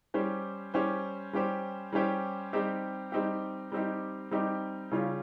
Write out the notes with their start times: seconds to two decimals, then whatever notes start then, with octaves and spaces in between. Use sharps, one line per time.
0.14 G3 C#4 G4 C5
0.74 G3 C#4 G4 C5
1.33 G3 C#4 G4 C5
1.93 G3 C#4 G4 C5
2.53 G3 C4 D#4 G4
3.12 G3 C4 D#4 G4
3.72 G3 C4 D#4 G4
4.31 G3 C4 D#4 G4
4.92 C#3 G3 C#4 F4